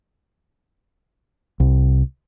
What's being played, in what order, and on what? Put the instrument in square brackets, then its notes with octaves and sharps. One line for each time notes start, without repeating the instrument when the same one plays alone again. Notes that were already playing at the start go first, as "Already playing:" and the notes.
[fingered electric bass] C2